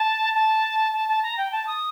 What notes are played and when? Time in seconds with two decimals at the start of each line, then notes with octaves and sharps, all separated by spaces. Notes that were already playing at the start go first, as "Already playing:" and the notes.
Already playing: A5
0.34 A5
0.93 A5
1.09 A5
1.23 A#5
1.38 G5
1.52 A5
1.67 D#6